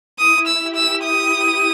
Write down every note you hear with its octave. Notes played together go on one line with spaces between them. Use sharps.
E4 D#6
E6
G4
E6
D#6